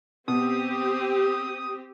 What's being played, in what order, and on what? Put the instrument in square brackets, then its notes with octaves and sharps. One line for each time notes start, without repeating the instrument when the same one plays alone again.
[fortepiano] B2 [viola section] C4 G4 [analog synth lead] D#6